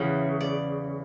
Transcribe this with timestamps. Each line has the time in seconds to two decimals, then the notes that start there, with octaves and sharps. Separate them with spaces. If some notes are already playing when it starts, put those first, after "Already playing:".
Already playing: E2 C#3 E3
0.40 D5